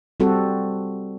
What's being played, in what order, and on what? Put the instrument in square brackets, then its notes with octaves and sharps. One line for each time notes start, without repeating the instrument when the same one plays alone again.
[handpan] G3 C4 F#4 A4